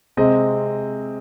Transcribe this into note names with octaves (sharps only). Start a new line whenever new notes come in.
C3 G#3 C4 D#5